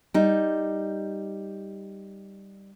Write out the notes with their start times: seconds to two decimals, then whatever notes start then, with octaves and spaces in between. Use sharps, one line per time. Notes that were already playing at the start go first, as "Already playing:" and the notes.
0.14 G3 D#4